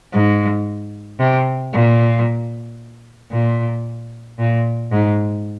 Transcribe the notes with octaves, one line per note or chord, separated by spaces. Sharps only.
G#2
C3
A#2
A#2
A#2
G#2